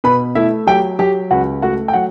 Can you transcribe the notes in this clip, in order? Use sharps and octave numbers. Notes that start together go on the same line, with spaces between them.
B2 B4 B5
A3 E4 E5
F#3 G4 G5
F#3 G4 G5
C#2 F#4 F#5
A3 F#4 F#5
G5
F#3 F#4 F#5